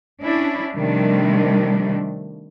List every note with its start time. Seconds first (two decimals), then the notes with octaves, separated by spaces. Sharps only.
0.21 C#4 D4 E4
0.75 C3 D#3 F3 G3 A3 D4